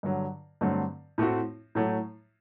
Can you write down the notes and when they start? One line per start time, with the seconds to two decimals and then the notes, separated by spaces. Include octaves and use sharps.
0.03 G2 D3 F#3
0.61 G2 D3 F#3 A3 C4
1.18 A2 A3 C4 F#4
1.75 A2 F#3 A3